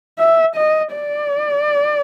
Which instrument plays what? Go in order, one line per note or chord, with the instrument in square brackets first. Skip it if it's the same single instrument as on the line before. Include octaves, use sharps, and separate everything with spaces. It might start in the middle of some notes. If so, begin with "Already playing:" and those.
[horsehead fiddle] E5
D#5
D5